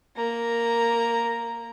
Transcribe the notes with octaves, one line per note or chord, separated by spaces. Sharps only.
A#3 A#5